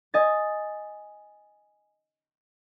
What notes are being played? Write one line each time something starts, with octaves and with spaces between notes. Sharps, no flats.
D#5 G#5 A6